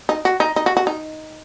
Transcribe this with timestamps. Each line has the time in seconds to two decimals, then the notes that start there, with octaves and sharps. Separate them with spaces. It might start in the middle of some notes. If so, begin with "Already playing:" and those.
0.09 D#4
0.25 F#4
0.40 D#4
0.56 D#4
0.66 F#4
0.77 F#4
0.87 D#4